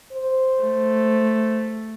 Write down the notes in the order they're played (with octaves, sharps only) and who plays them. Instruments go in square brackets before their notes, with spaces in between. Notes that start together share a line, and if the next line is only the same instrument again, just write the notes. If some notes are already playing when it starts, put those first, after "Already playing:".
[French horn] C5
[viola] A3